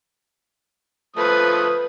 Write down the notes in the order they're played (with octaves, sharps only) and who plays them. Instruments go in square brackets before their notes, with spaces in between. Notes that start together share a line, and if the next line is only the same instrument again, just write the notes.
[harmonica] F3 A3 D#6 [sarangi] B4